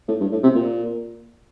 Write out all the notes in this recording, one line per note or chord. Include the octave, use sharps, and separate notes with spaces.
A2
G2
A2
C3
A#2